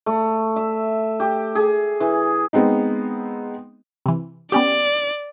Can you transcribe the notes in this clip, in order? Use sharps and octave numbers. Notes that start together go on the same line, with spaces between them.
A3
E5
G4
G#4
E3
G#3 B3 C4 D#4
C3 E3
B3 C#4 G4 D5